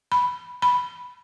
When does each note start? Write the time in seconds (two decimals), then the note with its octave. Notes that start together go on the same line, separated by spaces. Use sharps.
0.12 B5
0.62 B5